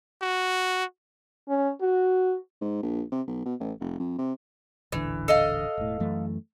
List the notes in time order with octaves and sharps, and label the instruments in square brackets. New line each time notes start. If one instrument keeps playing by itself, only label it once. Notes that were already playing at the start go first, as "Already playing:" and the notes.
[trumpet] F#4
[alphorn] C#4
F#4
[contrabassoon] G#2
A#1
C3
B1
B2
A1
F1
F2
C3
[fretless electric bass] D#1 A1 D3 [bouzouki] E3
[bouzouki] A4 D#5 F5
[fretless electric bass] E1 A2
F#2 E3 A3